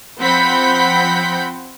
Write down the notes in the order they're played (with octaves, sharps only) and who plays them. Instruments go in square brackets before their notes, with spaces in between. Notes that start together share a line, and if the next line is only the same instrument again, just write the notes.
[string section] F3 C4 F#5 B5 G6 B6